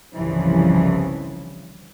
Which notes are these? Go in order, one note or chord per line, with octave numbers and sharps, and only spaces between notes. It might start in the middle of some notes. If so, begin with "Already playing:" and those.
G1 C2 C#3 E3 F3